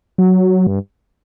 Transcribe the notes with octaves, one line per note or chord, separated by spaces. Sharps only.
F#3
G2